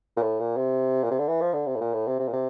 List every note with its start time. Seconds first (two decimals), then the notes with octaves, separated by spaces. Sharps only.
0.17 A#2
0.22 A2
0.40 A#2
0.57 C3
1.04 A#2
1.11 C3
1.19 D3
1.28 E3
1.41 F3
1.53 D3
1.67 C3
1.76 A2
1.81 A#2
1.94 A2
2.07 C3
2.19 C3
2.28 A#2
2.33 C3